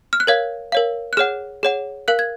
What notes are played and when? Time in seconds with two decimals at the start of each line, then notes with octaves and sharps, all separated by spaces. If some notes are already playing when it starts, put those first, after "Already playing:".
0.13 F6
0.20 F#6
0.27 A#4 C#5 F5 G#6
0.72 A#4 C#5 F5
1.13 F#6
1.17 G#4 C#5 F#5 F6
1.63 G#4 C#5 F#5
2.08 A#4 F5 F#6
2.19 G#6